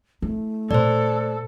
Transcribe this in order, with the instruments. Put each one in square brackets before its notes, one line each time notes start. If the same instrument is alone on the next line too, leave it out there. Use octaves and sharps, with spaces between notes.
[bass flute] A3 [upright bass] E4
[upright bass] A#2 [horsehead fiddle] A4 [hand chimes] C5 D5